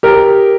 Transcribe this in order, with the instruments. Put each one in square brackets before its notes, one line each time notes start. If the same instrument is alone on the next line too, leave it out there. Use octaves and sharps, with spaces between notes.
[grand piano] G4 A#4